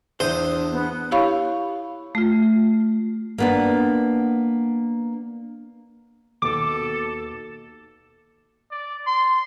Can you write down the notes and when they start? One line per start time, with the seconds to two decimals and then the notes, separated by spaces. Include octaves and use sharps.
0.20 E2 D4 C5 A#5 D#6
0.72 B3
1.11 E4 G4 C#5 F5 B5 C#6
2.15 A3 F4
3.38 A#3 B3 D4
6.42 D#2 B2 A4 D6
8.71 D5
9.07 C6